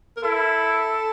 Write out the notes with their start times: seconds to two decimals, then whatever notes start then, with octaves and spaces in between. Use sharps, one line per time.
0.17 A#4
0.23 E4 A4